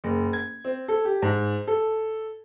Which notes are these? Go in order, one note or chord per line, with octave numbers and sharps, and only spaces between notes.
F#1
G#6
C4
A4
G4
G#2
A4